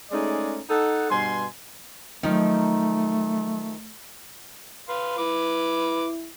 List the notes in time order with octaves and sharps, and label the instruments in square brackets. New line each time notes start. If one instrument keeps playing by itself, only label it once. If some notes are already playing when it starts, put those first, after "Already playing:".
[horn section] G#3 A3 C#4 D#4 G#4 D5
D#4 A4 F#5
G2 B2 G#5 C6
[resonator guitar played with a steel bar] D#3 F3 D#4 [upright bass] F#3 [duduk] A3
[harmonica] B4 F5 C6
[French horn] E4 [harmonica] B4 D6